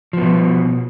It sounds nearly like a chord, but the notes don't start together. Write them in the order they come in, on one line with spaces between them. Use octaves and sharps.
F3 B3 B2